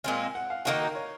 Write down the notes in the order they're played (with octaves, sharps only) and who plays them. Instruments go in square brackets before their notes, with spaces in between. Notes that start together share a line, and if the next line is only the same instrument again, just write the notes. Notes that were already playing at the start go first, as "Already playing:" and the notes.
[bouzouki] A#2 G#3 C4 F4 [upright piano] G#5
[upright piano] F#5
F5
[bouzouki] D#3 A#3 D#4 F#4 [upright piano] F5
[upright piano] A#4
C#5